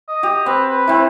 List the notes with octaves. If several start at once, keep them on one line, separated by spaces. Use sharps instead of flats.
D#5
G4
C4 B4
B4
C4 E4